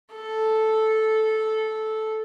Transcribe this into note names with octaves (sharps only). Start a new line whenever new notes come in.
A4